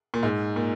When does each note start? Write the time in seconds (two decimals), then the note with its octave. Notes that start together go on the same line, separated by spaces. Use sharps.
0.14 A#2
0.23 G#2
0.56 A#2